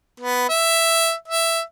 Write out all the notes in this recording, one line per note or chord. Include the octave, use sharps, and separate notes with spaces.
B3
E5
E5